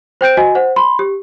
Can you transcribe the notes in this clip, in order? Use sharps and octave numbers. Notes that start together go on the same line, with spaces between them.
C5 G5 G6 D7
F#4 D#5 G#5
C5 F#5
B5 C6
G4